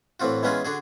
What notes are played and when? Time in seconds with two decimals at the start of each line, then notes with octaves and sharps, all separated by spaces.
0.20 A2 E3 C4 F4 F#4
0.43 E3 G#3 B3 C#4 F4 G#4
0.65 D3 D4 F#4 G#4